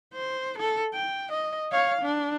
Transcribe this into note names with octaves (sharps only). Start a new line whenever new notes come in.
C5
A4
G5
D#5
C#5 F5
D4